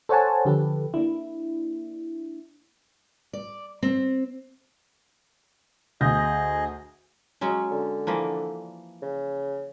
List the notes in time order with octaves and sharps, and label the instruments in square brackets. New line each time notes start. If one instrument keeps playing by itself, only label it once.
[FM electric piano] A4 C5 C#5 F#5 G#5 A5
D3 F3 G4 A4 B4
A#3 D4 E4
[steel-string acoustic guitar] D5
C4
[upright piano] D2 G6 A#6 [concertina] G#4 D#5
[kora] F#3 G#3 C#4
[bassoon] D3
[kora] E3 F3 A#3
[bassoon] C#3